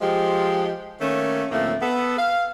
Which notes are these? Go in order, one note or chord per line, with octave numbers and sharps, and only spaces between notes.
F3 G#3 G4
D#3 A3 A#3 C#4
D2 A2 F3 A3 A#3 C4
B3 A4
F5